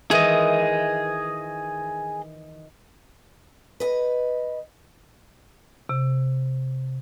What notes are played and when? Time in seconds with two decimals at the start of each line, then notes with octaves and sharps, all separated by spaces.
0.11 D#3 E3 G#4 D#5
3.80 B4 D#5
5.89 C3